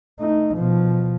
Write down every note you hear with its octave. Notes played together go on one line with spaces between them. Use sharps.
A3 D#4
B2 F3